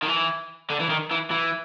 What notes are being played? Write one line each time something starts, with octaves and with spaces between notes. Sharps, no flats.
D#3
E3
D3
E3
D#3
E3
E3